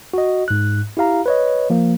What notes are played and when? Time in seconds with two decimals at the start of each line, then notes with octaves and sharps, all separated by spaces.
0.14 F#4 D#5
0.48 G#2 F#6
0.97 E4 G4 F5 A#5
1.26 B4 C#5 D#5
1.70 F3 A#3